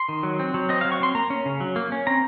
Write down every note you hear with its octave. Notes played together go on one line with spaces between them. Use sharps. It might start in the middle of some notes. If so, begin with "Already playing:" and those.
Already playing: C6
D#3
F#3
C4
F#3
C4 D#5
F5
F#3
C#6
C4 C6
A#3 A#5
C#4
C#3
F#3
A#3
C#4
C4 A#5